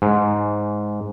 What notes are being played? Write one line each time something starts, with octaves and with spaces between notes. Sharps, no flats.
G#2